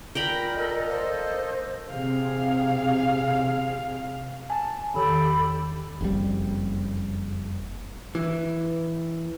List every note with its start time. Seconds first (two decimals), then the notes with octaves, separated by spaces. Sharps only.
0.15 A#2 A#4 G5 A#5 B5
0.56 A4 D#5
0.89 A#3 C5
1.91 C3 G#4 F5
4.50 G#5 A5
4.94 E2 D#3 G4 A4 B5
6.01 F#1 F2 C3 G3
8.15 E3